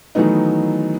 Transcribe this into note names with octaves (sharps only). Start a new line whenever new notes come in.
D#3 E3 F#3 A3 B3 D#4